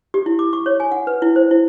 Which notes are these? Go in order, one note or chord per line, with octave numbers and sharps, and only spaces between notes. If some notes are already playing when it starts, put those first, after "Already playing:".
G4
E4
D6
C#6
C#5
G#5
F#5
B4
E4
C5
E4